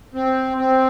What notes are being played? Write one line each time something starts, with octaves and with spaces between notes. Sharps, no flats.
C4
C4